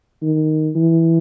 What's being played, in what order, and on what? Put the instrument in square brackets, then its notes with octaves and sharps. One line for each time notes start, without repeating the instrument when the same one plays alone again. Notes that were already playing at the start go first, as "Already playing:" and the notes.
[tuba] D#3
E3